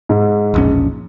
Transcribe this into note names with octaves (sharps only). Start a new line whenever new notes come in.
G#2
E1 A#1 C#4